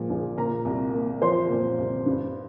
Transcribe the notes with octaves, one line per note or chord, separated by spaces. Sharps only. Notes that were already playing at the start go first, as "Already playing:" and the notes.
Already playing: A#2 F3 G#3
A#1
A#2 A#4 A#5
C2
A#3
F3 C5 C6
A#2
C2
G2